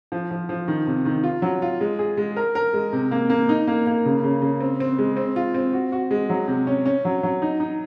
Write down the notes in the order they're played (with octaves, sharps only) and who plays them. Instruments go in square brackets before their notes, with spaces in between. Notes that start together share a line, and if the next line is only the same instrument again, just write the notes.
[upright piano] F3
F3
F3
D#3
C3
D#3
F4
F#3
F4
G#3
G#4
G#3
A#4
A#4
G#3
C3
A#3
A#3
D#4
A#3
A#3
C#3
C#3
C#3
C4
C4
G#3
C4
F4
C4
F#4
F#4
G#3
F#3
C3
C#4
C#4
F#3
F#3
D#4
D#4